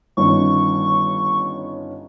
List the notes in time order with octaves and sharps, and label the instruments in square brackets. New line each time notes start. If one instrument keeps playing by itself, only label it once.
[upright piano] G1 D#3 C#4 [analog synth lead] C#6